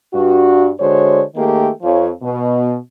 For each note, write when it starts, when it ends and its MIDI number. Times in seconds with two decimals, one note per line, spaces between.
0.13 0.69 43
0.13 0.69 66
0.79 1.22 50
0.79 1.22 56
0.79 1.22 66
0.79 1.22 72
0.79 1.22 73
1.36 1.69 51
1.36 1.69 57
1.36 1.69 58
1.36 1.69 67
1.36 1.69 68
1.36 1.69 70
1.82 2.09 41
1.82 2.09 53
1.82 2.09 73
2.22 2.76 47